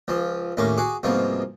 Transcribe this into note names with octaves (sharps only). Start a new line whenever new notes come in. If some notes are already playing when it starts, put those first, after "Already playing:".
C#2 F3
D#2 A2 A#3 C#4 D6
F#4 G#4 D6
C2 G#2 B2 F3 A#3